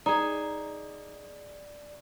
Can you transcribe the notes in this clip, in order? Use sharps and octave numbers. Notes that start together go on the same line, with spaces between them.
D#4 G#4 D5